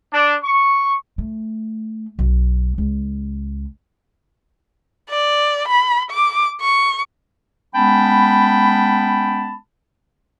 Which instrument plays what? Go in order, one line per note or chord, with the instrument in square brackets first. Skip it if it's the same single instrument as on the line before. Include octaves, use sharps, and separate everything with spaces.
[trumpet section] D4
C#6
[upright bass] A3
B1
C#2
[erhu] D5
B5
D6
C#6
[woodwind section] G#3 B3 C#4 G5 A5 B5